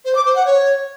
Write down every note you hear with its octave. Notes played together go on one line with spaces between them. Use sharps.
C5
D6
C5
F#5
C#5